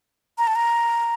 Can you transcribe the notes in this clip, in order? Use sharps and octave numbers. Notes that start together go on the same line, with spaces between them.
A#5
A5
A#5